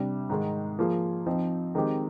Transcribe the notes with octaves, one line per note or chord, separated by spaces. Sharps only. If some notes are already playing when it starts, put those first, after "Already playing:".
Already playing: C3 G3 D4
G#2 D#3 G#3
F3 A#3 F4 G#4
F3 C4 D#4
D#3 G#3 C4 G4